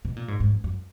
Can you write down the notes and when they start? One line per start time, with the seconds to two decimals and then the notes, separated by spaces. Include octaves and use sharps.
0.05 B2
0.16 A#2
0.28 G#2
0.40 G#2
0.52 F#2
0.64 F#2